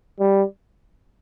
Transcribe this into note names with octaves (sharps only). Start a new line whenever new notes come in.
G3